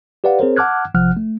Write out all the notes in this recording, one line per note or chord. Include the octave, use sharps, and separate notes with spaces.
G4 B4 D5 F5 F#5
C4 G#4 A#4 C5 C#5
F#5 A5 D6 F6 F#6 G#6
A1 C3 F3 F#5 F6 F#6
A3